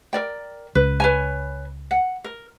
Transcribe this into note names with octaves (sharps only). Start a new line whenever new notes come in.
A#4 D5 G5
C#2 B4
B4 C#5 G#5
F#5
A#4